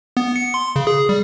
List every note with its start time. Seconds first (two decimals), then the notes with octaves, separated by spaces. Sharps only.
0.17 B3
0.36 C#7
0.54 C6
0.76 C#3
0.87 G#4
1.09 G3